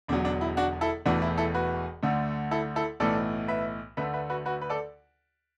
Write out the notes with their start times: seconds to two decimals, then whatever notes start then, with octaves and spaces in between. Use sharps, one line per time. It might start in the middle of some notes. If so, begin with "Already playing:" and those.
0.08 E1 E2 D3 F#3 D4
0.25 D4
0.41 E4
0.57 D4 F#4
0.81 E4 A4
1.06 E1 E2 E3 A3 D4 F#4
1.22 E4
1.38 E4 A4
1.54 F#4 B4
2.03 D2 D3 A3
2.51 E4 A4
2.76 E4 A4
3.00 B1 A2 E3 A3 A4 D5
3.48 B4 E5
3.97 D2 D3 A3 B4 E5
4.14 B4 E5
4.30 F#4 B4
4.46 F#4 B4
4.61 B4
4.70 A4 D5